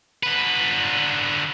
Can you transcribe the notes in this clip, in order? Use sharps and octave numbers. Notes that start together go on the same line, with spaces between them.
D3 B4